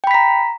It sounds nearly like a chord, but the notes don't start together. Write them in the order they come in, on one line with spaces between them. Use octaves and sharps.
G5 B5 B6 A#5